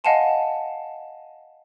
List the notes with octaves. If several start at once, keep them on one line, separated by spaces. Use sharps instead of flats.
D#5 F5 F#5 G#5 A5 C6